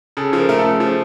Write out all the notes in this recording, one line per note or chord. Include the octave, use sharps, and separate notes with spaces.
C#3 A4
F3
A#4
A3 A#4
A4
C#3
F3